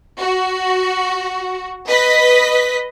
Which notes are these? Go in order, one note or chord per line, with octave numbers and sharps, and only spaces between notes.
F#4
B4 D#5 B6